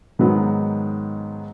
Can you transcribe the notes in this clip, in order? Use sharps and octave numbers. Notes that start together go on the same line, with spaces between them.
G#2 D#3 F#3 B3